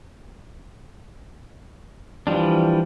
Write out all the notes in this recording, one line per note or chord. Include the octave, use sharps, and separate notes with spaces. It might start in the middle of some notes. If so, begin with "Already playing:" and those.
E3 F3 G3 D4